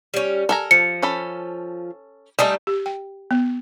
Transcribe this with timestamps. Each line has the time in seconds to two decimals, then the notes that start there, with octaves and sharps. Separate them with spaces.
0.14 G3 C#4
0.49 A4 A#4 G#5 A#5
0.71 F3 C#7
1.02 C#4 A4 B5
2.39 G3 A3 D#4 G#4 A4 D#5
2.67 G4
2.86 G5
3.31 B3